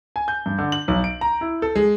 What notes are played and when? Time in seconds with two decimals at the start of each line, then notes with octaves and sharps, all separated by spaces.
0.16 G#5
0.28 G6
0.46 G2
0.58 D3
0.72 F#7
0.88 B1
1.04 D7
1.21 A#5
1.41 E4
1.62 A4
1.75 G#3